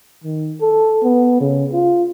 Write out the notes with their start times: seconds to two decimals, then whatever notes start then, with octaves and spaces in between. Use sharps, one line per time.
0.24 D#3
0.61 A4
1.03 B3
1.41 C#3
1.73 F4